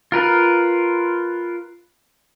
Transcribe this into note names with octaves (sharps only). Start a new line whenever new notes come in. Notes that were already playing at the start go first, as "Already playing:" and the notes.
F4 A#4 B4